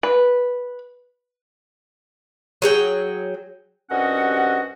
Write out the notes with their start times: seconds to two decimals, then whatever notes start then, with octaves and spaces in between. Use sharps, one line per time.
0.03 B4
2.62 F#3 G#4 G5
3.91 C2 G2 C#4 F#4 D#5 F#5